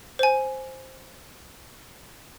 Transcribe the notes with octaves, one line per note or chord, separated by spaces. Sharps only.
C5 G#5